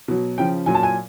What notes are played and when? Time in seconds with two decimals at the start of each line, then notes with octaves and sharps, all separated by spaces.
0.08 B2 F#3
0.38 C#3 F3 G5
0.66 A#2 F#3 G#5
0.75 A5
0.83 G#5